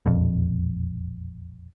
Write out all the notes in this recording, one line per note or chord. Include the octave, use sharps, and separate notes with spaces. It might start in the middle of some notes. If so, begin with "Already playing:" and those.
E1 A#1 F2